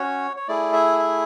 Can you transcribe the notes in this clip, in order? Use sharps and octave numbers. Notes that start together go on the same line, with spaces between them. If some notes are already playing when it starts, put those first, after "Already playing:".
Already playing: C#4 F#4 C#5
C#5
A3 E4 G#4 D5
E5
E5